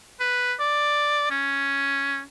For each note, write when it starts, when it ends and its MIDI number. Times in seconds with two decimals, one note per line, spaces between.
0.20 0.53 71
0.60 1.28 74
1.31 2.21 61